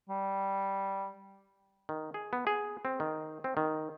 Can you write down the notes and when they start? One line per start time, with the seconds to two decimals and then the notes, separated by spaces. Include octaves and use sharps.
0.09 G3
1.89 D#3
2.14 G#4
2.33 B3
2.47 G#4
2.85 C4
3.00 D#3
3.44 C4
3.57 D#3